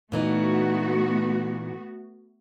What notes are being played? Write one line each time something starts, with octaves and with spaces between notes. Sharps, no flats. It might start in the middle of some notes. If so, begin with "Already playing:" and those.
A#2 E3 A3 B3 D#4 F#4